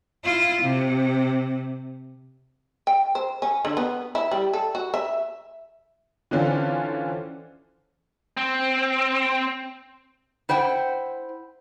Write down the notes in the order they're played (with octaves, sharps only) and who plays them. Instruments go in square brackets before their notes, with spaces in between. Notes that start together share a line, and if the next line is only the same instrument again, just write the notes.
[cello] E4 F4
C3
[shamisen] G5
C5
C#4
D3
B3
E4
G3
A4
F#4
E5
[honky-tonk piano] D3 E3 C4 C#4 F4 A4
[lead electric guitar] C4
[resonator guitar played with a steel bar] E4 C5 F#5 G5